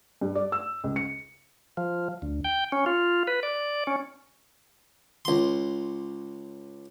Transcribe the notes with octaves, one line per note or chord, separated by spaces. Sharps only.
G2
D5
E6
C#2
C#7
F3
D2
G5
C#4
F4
B4
D5
C#4
C#2 C6